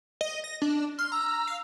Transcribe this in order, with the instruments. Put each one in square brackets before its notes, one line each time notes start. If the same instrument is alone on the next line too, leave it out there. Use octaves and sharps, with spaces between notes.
[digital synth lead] D#5
A#6
D4
[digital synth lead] C6 [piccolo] F6
[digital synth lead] A#5 [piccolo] E6
[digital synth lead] F5